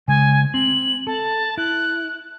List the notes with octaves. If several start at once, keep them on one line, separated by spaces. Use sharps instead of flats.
C#3 G#3 G#5
C4 F#7
A4 A5
E4 F#6